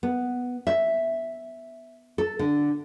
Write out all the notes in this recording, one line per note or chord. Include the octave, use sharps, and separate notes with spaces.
B3
E5
A4
D3